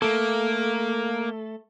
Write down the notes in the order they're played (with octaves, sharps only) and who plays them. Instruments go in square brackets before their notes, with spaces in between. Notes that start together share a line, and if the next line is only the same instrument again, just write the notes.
[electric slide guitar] A3 A4 [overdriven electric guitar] A#3